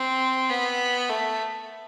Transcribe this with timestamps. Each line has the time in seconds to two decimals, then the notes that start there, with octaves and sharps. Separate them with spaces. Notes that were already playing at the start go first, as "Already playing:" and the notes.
Already playing: C4
0.50 B3
1.10 A3